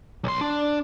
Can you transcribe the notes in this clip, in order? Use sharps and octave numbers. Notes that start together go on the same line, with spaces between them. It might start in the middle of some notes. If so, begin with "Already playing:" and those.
B1 C6
D4